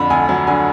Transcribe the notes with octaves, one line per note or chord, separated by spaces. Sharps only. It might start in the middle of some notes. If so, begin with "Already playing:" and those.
Already playing: F2 D3 B5
D2 G#5
F#3
D3 G#5